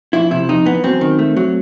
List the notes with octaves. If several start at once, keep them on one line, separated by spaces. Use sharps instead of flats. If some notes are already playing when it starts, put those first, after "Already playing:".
F2 E4
C3 E4
F2 D#4
E3 B3
F#2 C4
D#3
A3
F#3